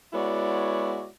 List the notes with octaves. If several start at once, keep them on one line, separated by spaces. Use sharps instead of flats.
G#3 B3 E4 F#4 C#5 D5